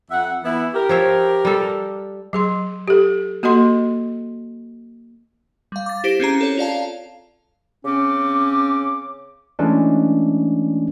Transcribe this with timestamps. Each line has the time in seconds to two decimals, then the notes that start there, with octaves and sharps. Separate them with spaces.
0.11 F2 E5 F#5
0.44 E3 B3 E4
0.74 G4 A#4
0.89 F3 C#5 E5
1.45 G3 A4
2.33 F#3 G#4 C6
2.88 G4 A4
3.43 A#3 F#4 A4 D#5 C6
5.72 G3 F5
5.86 D6 A6
6.04 E4 G4 C5 A#6 D7
6.20 C4 C#4 G#4 A#5
6.41 A4 C#5
6.57 F4 D5 F5 A5
7.85 C#3 C4 C#4 D6
9.59 E3 G#3 A3 C#4 D4